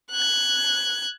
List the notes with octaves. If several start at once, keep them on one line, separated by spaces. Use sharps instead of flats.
F#6 G#6